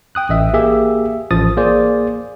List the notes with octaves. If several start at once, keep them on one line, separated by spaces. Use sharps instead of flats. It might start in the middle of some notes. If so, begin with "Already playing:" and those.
G5 D#6 F#6
A1 D#5 E5
A#3 G4 G#4 E5
A1 F3 D#6 A6
A#3 G#4 C5 D5